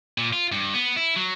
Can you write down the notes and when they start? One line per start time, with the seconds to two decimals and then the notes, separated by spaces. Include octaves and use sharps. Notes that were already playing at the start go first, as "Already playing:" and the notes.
0.18 A#2
0.33 F4
0.52 G2
0.74 B3
0.96 E4
1.16 F#3